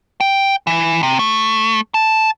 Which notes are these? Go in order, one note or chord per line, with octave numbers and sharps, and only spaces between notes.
G5
E3
C3
A3
A5